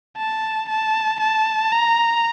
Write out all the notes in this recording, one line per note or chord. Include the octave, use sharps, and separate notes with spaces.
A5
A5
A5
A#5